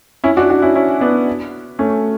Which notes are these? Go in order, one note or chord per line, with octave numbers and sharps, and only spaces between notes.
C#4 E4
D4 F#4
D4 F#4
C#4 E4
C#4 E4
B3 D4
A3 C#4